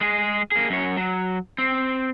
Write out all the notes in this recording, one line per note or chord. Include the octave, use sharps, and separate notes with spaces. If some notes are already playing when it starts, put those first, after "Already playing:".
G#3 G#4
A#3 G#4
F#2 C#5
F#3
C4